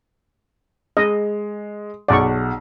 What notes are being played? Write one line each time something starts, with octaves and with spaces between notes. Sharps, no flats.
G#3 D#5
B1 G#4 D5 F#5 C#6